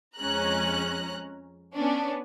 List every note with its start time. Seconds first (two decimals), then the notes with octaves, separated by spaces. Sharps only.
0.17 F2 G#3 C#4 A#5 F#6
1.74 B3 C#4 D4